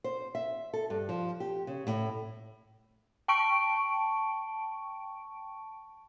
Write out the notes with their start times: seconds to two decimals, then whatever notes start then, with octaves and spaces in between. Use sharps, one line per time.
0.04 C5
0.35 E5
0.74 A4
0.90 G2
1.09 F3
1.40 G4
1.67 C#3
1.87 A2
3.28 G5 A5 C#6 D7